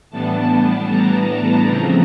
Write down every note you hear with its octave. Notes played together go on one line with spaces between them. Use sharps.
A2 E3 G3 B3 D4 A5
A#5
C#3 F3 A3 C4